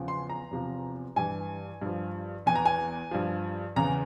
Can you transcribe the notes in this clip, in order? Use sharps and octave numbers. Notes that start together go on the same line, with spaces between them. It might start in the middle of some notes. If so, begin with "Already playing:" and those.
Already playing: E2 C#3 F3
C6
A#5
E2 C3 F3
G2 E3 G#5
G2 F3
E2 E3 G#5
A#5
G#5
G2 F3
E2 C#3 E3 A#5